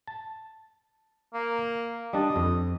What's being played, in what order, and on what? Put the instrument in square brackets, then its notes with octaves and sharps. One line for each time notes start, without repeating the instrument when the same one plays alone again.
[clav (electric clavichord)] A5
[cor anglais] A#3
[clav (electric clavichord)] G3 D4 A5 [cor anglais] D#5
[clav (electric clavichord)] F2